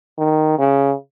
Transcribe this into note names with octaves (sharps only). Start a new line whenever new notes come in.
D#3
C#3